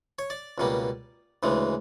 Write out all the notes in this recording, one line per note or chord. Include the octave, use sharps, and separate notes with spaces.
C#5
D5
C#2 B2 G3 A#3
D2 C#3 E3 G#3